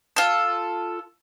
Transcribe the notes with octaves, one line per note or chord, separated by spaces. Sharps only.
F4 A4